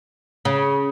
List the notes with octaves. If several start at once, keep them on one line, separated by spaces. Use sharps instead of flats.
C#3